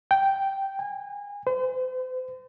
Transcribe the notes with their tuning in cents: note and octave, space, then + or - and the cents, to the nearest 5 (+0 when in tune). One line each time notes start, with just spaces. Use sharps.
G5 -5
G#5 -30
C5 -40